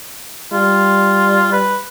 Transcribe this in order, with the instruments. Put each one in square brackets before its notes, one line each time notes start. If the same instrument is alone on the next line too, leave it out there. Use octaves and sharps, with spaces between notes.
[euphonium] G3 [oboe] F4
[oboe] B4